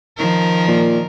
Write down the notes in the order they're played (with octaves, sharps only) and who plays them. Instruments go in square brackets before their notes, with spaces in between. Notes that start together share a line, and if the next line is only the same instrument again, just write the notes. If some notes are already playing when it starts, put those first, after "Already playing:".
[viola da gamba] D#3 F3 A#4
[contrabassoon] A#2